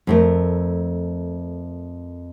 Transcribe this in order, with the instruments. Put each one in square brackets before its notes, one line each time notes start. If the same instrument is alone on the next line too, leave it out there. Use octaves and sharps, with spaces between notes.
[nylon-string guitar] F2 A3 A#4